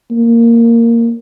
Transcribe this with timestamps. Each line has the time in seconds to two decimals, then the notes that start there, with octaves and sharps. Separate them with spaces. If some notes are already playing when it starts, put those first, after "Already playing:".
0.11 A#3